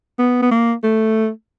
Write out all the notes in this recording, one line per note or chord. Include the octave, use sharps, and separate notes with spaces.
B3
B3
A#3
A3